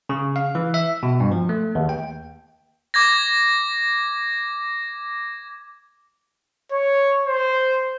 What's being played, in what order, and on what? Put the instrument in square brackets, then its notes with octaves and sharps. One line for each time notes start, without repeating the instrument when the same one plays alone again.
[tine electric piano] C#3
F5
E3
E5
B2
G2
F3
A3
D#2
G5
[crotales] D6 G#6 A#6
[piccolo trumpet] C#5
C5